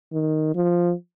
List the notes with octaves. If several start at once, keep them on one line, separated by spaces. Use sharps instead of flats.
D#3
F3